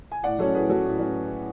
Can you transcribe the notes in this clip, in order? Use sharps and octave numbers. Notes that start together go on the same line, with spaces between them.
G#5
A2 D5 F#5
F#3 C#4 A4 C#5
A2 G#4 B4
F#3 C#4 F#4 A4
A2
F#3 C#4